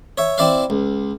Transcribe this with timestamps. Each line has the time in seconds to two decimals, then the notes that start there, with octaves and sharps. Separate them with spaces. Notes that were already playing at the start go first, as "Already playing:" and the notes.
0.18 C#5 E5
0.38 C4 E4 D5 E5 F5
0.70 C#2